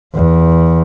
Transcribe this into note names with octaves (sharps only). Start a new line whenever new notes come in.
E2